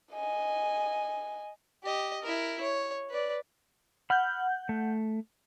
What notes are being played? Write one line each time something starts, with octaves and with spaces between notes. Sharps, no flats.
D#5 G#5
G4 D#5
E4 A#4
C#5
B4 D5
F#5 B5 F6 G6
A3